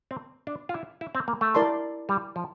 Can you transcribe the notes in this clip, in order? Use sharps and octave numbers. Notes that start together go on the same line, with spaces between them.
C4
D4
F4
E4
E4
C4
A#3
A3
E4 A#4 D5 A5 C6
G3
F3